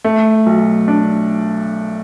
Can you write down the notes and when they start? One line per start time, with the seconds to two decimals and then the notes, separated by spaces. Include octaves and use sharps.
0.04 A3
0.46 B1
0.88 D4